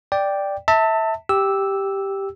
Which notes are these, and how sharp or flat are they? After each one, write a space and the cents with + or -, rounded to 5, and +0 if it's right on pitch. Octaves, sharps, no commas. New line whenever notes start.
D5 +0 G5 +0
E5 -20 A5 +25
G4 +0 E6 -5